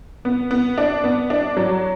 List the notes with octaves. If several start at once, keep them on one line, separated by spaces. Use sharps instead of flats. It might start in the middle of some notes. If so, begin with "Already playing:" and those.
B3
B3
D4
B3
D4
F#3